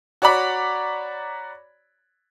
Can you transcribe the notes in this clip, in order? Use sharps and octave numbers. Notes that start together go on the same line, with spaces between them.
F#4 C#5 D5 A#5 B5 D6